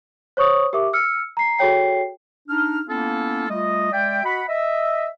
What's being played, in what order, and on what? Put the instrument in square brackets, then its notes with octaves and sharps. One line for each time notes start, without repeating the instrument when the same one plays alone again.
[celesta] C5 C#5 C#6 D#6
G4 A#4 E5 D6
E6 F6 C#7
A#5 C7
F#4 G#4 A4 C#5 G5 C7
[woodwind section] D4 D#4 F6
A#3 B3 C#4 E4 F4 A4
G3 A3 F4 D#5
G#3 D5 E5 G5
F#4 D#5 F#5 B5
D#5 E5